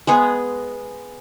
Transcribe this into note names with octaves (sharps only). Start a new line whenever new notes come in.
G#3 B3 G#4